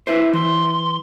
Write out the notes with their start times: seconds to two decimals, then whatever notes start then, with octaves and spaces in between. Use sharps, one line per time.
0.07 E4 B4 C5 E5
0.33 E3 C6